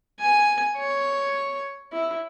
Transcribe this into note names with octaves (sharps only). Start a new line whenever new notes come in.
G#5
C#5
E4